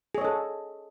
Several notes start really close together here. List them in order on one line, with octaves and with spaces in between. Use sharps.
G#4 C#5 D#5 A4